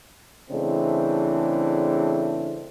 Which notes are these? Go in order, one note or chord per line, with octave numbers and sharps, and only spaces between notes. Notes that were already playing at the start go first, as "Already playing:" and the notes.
C#3 E3 G#3 A3 C4 D4